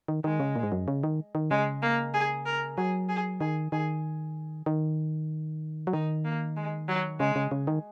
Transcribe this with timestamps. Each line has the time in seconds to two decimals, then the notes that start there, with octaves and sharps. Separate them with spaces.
0.08 D#3
0.24 D#3 G#3
0.40 C#3
0.56 A#2
0.63 G#2
0.72 F#2
0.88 C#3
1.04 D#3
1.35 D#3
1.51 C#3 G#3
1.82 A#3
2.14 G#4
2.46 A#4
2.77 F#3 G#4
3.09 G#4
3.41 D#3 G#4
3.72 D#3 G#4
4.66 D#3
5.87 F#3
5.93 D#3 D#4
6.25 A#3
6.56 G#3
6.88 F#3
7.20 C#3 G#3
7.36 C#3
7.51 C#3
7.67 D#3